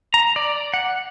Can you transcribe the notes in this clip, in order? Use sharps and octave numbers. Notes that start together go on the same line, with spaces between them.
A#5
D5
F#5